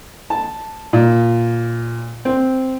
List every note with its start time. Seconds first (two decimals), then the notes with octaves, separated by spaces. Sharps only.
0.30 A5
0.93 A#2
2.25 C4